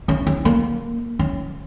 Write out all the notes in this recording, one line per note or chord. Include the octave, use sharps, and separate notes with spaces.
C#4
C#4
A#3
C#4